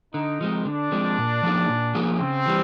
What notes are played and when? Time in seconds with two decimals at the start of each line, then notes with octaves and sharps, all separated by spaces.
0.14 D3 D#4
0.41 F3 G#3 C4
0.65 D3 D4
0.92 F3 G#3 C4
1.18 A#2
1.43 F3 A#3 D#4 G#4
1.69 A#2
1.95 F3 A#3 D#4 G#4
2.20 C#3 C4
2.46 E3 G3